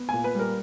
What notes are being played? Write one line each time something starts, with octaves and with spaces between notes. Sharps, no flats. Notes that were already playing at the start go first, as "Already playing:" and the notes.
Already playing: B3
A#2 G#5
B4
G3 A#4